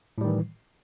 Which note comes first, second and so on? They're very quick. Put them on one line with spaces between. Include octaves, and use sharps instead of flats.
A2 G3 D#3 E3